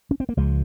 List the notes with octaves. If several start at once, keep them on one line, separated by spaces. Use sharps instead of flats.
C#4
C4
A#3
C#2 F3 G#3